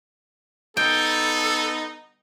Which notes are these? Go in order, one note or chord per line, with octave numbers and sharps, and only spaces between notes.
B3 D#4 A4 G5